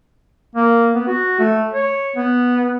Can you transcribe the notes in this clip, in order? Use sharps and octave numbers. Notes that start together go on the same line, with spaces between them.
A#3
B3
F#4
A3
C#5
B3